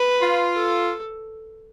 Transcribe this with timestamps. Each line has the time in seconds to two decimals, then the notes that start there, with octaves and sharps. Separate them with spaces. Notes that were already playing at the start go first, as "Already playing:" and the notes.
Already playing: B4
0.21 F4
0.55 A4